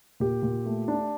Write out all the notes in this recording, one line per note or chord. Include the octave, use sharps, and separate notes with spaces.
A#2 G4
A#2
A3
D4